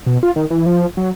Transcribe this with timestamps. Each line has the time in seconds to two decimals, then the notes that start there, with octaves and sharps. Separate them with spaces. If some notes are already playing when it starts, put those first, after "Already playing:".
0.06 B2
0.23 F4
0.36 D#3
0.50 E3
0.66 F3
0.97 F#3